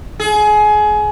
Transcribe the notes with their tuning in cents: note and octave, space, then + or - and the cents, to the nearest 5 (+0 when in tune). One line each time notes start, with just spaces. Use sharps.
G#4 +25